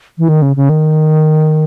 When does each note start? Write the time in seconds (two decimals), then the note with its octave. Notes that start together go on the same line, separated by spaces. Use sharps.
0.18 E3
0.29 D#3
0.42 C#3
0.56 C#3
0.69 D#3